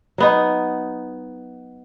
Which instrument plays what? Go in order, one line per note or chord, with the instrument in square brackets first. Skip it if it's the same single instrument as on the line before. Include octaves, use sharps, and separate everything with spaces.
[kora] F#3 B3 D#4